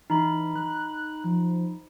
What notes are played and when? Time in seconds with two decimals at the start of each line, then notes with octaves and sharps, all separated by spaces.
0.10 E3 D#4 B5
0.56 F#6
1.24 F3